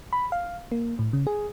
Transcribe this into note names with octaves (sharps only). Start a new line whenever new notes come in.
B5
F5
A#3
A2
C#3
G#4